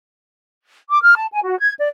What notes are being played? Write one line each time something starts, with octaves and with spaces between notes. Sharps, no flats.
D6
F6
A5
G#5
F#4
G#6
D5